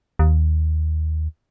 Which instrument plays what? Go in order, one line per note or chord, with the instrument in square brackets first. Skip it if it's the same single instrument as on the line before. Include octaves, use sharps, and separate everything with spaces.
[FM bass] D#2